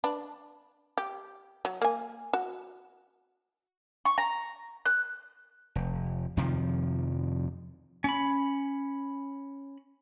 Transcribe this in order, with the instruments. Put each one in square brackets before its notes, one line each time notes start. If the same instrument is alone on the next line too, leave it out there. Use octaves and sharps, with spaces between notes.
[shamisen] D4 B4
G4
F#3
A#3 G#5
F#4
[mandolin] C#6
A#5
F#6
[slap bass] F1
F2 C3 D#3 F3
[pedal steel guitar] C#4 B5